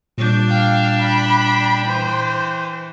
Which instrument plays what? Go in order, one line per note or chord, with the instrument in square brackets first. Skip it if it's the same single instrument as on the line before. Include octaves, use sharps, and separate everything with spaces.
[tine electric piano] A#2 G3 G6 [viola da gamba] D4
[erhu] F5 [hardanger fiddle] G5
[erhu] B5
[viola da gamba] E3 [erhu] C5